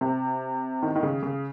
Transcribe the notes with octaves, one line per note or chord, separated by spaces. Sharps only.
C3
D#3
D#3
C#3
C#3